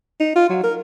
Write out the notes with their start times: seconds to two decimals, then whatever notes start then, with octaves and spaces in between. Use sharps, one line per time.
0.20 D#4
0.36 F4
0.50 F#3
0.64 A#4